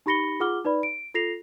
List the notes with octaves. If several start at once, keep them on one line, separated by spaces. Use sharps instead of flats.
D#4 G4 B5 A#6 C#7 G7
F4 G#4 F#5 D6 F6 G7
D#4 B4 D5 B5
D7
F4 A4 A#6 C7 F7